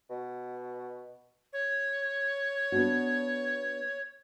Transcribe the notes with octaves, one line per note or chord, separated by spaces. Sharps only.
B2
C#5
B3 D4 F#4